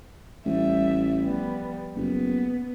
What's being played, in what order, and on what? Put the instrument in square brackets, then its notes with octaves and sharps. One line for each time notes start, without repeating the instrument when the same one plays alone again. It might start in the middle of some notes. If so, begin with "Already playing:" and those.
[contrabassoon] A1 [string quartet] G3 E5
[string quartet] F3 G3 B3
[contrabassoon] F#1 [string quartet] B3